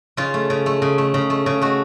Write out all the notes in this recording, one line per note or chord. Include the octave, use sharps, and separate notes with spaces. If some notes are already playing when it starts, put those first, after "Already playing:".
C#3 F4
A3
C#3
A3
C#3
A3
C#3
A3
C#3
A3 F#4